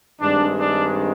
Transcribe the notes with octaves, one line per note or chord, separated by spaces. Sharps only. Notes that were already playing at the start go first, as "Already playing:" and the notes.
G2 D#3 G#3 C4 D4
D4